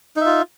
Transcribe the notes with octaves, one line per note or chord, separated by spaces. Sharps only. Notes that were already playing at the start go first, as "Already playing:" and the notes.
D#4 F4 E5